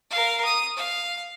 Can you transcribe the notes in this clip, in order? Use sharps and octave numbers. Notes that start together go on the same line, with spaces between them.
A#4 F5
D#6
F5